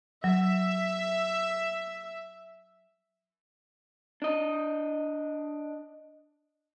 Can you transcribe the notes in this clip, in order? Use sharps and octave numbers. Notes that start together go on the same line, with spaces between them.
F#3 E5
D4 D#5